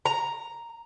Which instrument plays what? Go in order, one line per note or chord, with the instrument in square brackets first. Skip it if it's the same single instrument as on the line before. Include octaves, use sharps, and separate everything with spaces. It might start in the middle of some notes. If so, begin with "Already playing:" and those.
[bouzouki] A#5